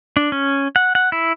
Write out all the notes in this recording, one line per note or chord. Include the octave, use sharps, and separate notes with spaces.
D4
C#4
F#5
F#5
E4